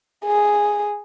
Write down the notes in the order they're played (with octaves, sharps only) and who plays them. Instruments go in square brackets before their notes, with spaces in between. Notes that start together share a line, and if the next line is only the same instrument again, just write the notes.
[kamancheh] G#4